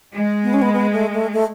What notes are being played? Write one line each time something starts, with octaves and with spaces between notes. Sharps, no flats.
G#3
B3
C#4
B3
B3
A3
A3
A3